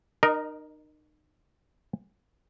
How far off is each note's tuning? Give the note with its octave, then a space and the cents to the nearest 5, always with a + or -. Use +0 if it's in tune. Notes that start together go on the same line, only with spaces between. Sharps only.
D#4 -35 A#4 +5 D#5 +0